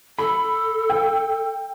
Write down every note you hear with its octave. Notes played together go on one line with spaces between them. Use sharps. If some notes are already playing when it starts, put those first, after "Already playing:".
A4 B5
G5